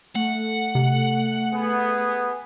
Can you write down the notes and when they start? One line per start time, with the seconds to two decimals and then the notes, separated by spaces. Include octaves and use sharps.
0.15 A3 F#5
0.75 C3
1.52 B3 G#4